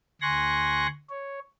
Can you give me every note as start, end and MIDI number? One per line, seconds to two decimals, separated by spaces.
0.22 0.87 38
0.22 0.87 80
0.22 0.87 84
0.22 0.87 85
0.22 0.87 90
0.22 0.87 94
1.09 1.39 73